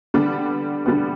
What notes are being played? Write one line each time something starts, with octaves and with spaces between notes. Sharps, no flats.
D3 G3 B3 D4
D3 G3 B3 D4